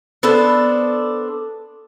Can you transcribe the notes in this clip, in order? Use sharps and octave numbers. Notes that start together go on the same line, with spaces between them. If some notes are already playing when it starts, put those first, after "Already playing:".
B3 D4 A4 C5